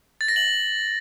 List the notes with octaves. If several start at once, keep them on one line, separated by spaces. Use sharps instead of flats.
A6
A#6
F#7